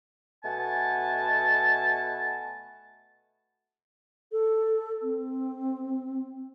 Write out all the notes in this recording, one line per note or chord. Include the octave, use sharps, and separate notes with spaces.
B2 A3 F#5 G#5 A5
A4
C4